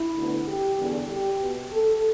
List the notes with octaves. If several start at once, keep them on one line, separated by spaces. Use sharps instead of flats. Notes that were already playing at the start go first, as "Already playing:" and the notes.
Already playing: E4
D2 D3 B3
G4
E2 D3 G3 B3
G4
B2 B3
A4